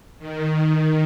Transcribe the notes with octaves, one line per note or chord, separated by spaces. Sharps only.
D#3